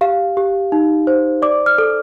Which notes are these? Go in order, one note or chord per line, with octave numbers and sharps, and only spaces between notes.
G4 F5
G4
D#4
C5
D5 D6
F6
A4